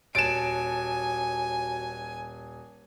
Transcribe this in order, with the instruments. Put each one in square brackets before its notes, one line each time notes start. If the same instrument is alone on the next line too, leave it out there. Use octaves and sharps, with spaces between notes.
[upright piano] D#1 A6 [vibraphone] F#4 C#5 A5 [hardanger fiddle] G#5 [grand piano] D7 E7